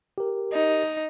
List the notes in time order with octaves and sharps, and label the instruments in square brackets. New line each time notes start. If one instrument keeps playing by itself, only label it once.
[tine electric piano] G4 A#4
[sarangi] D#4